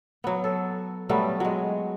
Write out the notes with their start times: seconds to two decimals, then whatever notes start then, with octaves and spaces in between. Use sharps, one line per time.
0.24 F#3 B3
0.44 A4
1.09 F#3 G3 A3 B3
1.40 F#3 G#3